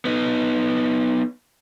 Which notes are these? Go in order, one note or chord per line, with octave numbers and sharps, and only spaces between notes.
B3 D#4